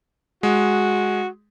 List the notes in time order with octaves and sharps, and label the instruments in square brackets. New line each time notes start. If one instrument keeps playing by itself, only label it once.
[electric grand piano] G#3 [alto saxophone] F#4